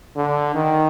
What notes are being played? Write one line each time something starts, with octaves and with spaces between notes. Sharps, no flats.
D3
D#3